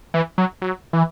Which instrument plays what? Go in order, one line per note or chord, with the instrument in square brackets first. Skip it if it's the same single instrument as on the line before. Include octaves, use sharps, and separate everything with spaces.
[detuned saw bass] E3
F#3
F#3
E3